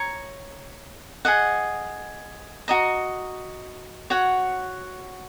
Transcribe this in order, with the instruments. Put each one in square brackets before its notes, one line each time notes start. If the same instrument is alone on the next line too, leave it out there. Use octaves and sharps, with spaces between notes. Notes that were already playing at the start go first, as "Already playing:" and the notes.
Already playing: [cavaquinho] C#5 A#5
G#4 D#5 F#5
F#4 D#5 A#5
F#4 C#5 F#5